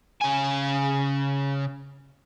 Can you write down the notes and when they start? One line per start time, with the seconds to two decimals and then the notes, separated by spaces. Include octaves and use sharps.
0.22 C#3 G#5